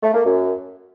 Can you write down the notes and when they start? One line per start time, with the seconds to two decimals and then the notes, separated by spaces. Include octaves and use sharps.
0.02 A3
0.13 A#3
0.25 F#2